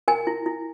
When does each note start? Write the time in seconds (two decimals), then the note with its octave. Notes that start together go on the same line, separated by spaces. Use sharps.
0.08 A#4 G#5
0.27 E4
0.46 E4